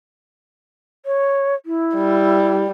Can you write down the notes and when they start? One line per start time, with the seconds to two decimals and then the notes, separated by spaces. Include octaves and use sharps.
1.06 C#5
1.66 E4
1.95 G3